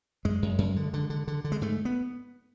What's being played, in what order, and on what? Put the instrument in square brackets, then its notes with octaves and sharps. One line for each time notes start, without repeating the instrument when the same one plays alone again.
[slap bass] F#2 G#3
F#2
F#2
D3
D3
D3
D3
D3
G#3
G#2 A3
B3